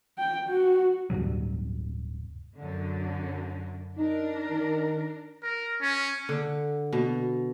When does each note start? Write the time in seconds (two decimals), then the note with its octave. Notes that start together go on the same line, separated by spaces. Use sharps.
0.18 G5
0.49 F#4
1.10 D1 G2 C3 F#3
2.59 F#2 D3
3.98 D4 D#4 A#4
4.51 D#3
5.43 A#4
5.81 C#4
6.29 D3
6.93 B2